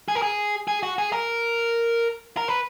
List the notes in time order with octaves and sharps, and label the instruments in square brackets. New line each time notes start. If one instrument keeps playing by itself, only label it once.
[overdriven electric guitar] G#4
A#4
G#4
G#4
F#4
G#4
A#4
A#4
B4